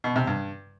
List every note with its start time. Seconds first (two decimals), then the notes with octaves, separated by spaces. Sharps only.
0.04 B2
0.16 C3
0.27 G2